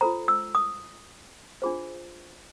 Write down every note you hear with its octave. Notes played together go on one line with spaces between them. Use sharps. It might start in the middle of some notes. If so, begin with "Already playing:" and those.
F4 A4 C5 A#5
E6
D#6
D4 F4 G#4 C5